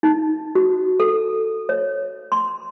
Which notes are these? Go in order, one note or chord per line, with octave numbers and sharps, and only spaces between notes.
D#4
F#4
A4
C#5
C6